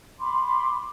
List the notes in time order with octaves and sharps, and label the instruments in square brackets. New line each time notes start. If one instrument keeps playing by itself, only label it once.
[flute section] B5 C6 D6